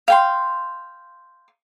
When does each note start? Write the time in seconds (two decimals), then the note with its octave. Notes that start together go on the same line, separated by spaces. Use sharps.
0.08 F5 G5 C6